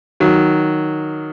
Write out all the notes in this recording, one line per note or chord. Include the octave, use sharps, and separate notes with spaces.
D#3 F#3